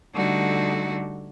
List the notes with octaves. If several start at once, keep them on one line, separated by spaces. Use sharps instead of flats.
D3 G3 A3 D#4 F#4